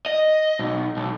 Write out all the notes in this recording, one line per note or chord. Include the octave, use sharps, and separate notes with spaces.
D#5
B1
B1